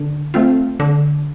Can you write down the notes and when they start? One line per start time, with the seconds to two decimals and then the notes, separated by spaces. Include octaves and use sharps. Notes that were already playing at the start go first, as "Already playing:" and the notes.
Already playing: D3
0.34 A3 C4 F4
0.80 D3